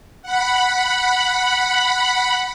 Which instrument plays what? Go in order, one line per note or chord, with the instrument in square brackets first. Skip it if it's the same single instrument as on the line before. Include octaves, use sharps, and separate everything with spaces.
[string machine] F#5 B5